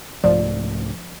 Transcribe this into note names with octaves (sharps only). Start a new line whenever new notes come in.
C2 G#2 F3 A3 D5